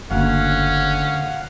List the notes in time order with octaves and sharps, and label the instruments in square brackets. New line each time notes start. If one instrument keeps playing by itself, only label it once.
[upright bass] F#1 [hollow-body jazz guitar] D2 [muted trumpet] C#4 [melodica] F5 F#5